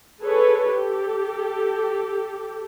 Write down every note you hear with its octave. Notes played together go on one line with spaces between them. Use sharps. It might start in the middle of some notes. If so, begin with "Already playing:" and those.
G#4 A4 B4 C#5
G4 A4